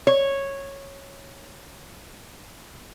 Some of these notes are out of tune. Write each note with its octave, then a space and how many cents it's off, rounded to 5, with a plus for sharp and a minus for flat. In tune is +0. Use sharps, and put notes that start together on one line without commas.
C#5 -10